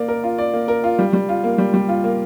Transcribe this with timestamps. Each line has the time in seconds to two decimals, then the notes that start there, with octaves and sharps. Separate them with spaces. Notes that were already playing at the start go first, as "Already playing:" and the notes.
Already playing: A#3 D5
0.08 A#4
0.24 F4
0.38 D5
0.53 A#3
0.68 A#4
0.84 F4
0.99 G3
1.13 G3
1.29 F4
1.44 A#3
1.58 G3
1.74 G3
1.89 F4
2.04 A#3